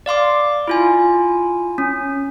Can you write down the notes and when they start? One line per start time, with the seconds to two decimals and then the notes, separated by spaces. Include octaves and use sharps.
0.06 D5 F5 C6 D6
0.68 E4 F4 G#5
1.78 C#4